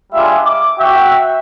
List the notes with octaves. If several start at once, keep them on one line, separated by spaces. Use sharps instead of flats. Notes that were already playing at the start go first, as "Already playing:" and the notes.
G3 G#3 D4 F4 E5 F5
D6
F#4 E5 G5